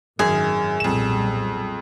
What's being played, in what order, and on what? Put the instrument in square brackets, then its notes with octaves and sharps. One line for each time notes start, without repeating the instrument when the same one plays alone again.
[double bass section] G#1 D#3 [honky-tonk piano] F#2 [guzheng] G#4
[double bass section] B1 A#2 G3 [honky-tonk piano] F2 E7